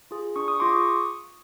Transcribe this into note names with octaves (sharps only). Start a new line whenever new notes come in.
F4 G#4
D4 C#6 D#6
C#6 D#6
F4 G#4 C6 D6
C#6 D#6